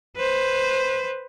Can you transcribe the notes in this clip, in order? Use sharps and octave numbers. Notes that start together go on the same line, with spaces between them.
B4 C5